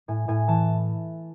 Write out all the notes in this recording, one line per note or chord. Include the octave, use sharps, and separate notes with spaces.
A2 G#5
A2 G#5
E3 A5